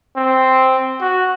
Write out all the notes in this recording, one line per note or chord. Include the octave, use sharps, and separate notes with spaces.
C4
F#4